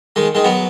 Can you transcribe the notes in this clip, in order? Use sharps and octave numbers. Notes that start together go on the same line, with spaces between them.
D#3 G#3
D#3 G#3
F#3 B3